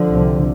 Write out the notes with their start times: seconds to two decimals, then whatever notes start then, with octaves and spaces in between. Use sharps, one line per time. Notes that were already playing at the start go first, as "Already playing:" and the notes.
Already playing: D3 F3
0.10 C2 C3